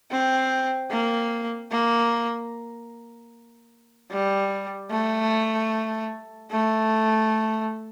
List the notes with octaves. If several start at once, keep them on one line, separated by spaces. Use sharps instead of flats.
C4
A#3
A#3
G3
A3
A3